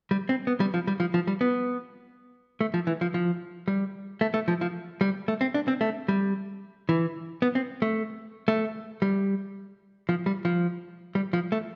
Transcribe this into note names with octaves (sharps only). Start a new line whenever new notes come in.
G3
C4
B3
G3
F3
G3
F3
F3
G3
B3
A3
F3
E3
F3
F3
G3
A3
A3
F3
F3
G3
A3
C4
D4
C4
A3
G3
E3
B3
C4
A3
A3
G3
F3
G3
F3
G3
F3
A3